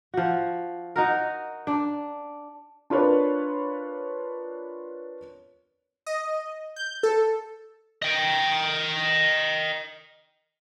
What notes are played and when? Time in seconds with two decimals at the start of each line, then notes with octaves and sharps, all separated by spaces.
0.14 F3 F#4
0.96 D#4 F#4 A#4
1.67 D4
2.90 D4 F4 A#4 B4 C#5
6.07 D#5
6.76 G6
7.03 A4
8.02 D#5 G5